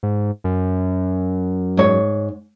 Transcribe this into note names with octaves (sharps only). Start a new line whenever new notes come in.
G#2
F#2
G#2 C#5